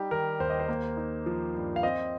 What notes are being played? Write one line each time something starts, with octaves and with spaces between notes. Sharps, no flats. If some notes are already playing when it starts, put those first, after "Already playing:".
Already playing: G3 D#4 G4
D#3 A#4
D#2 C5
D#5
C5
A#3
D#4
F3
G2
F5
C4 D#5